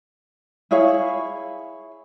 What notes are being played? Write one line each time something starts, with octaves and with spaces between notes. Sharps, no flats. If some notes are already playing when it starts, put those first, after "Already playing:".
E4 G#4 C#5 F5